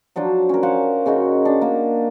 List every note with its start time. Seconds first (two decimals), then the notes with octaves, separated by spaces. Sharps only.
0.16 F3 F#3 D4 C5
0.49 C#4 A#4
0.63 C5 F5 F#5
1.06 C#3 C#4 D#4 F#4
1.45 D4
1.61 A#3